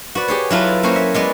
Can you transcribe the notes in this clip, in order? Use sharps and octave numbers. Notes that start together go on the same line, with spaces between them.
F#4 B4 D5
G4 G#4 C#5
F#3 E4 F4 A4 B4
A#3 C#4 F#4 C5 C#5
E5
G#3 B3 D5